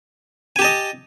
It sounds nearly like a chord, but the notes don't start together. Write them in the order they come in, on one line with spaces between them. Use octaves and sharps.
G#5 G4 A5 D#5